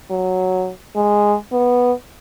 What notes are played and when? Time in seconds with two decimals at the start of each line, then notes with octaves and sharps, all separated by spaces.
0.10 F#3
0.96 G#3
1.52 B3